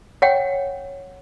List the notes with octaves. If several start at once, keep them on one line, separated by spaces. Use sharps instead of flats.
C#5 F#5 G5